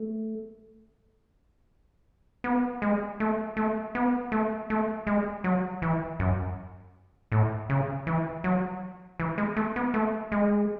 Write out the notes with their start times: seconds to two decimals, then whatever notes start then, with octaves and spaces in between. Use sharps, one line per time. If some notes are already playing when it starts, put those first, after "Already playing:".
Already playing: A3
2.44 B3
2.82 G#3
3.20 A3
3.57 A3
3.95 B3
4.32 A3
4.70 A3
5.07 G#3
5.44 F#3
5.82 E3
6.20 F#2
7.32 A2
7.70 C#3
8.07 E3
8.44 F#3
9.20 E3
9.38 G#3
9.56 A3
9.76 B3
9.94 A3
10.32 G#3